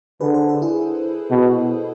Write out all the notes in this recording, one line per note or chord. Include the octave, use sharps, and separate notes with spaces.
D3 G#4 B4
A4 C5
G#4 B4
E4 G#4
B2